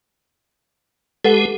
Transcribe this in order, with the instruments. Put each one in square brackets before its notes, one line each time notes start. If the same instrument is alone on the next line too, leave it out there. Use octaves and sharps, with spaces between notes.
[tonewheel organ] G#3 G4 [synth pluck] A4 B4 F#5